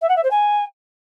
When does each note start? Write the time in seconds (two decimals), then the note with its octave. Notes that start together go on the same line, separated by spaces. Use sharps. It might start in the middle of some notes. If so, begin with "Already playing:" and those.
0.02 E5
0.09 F#5
0.16 E5
0.24 C5
0.31 G#5